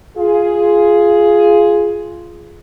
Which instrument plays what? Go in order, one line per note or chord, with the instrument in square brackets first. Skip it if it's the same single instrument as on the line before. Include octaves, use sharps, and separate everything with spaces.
[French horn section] F4 G#4